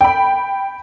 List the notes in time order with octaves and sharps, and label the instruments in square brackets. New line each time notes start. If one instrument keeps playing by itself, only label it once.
[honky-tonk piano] G5 B5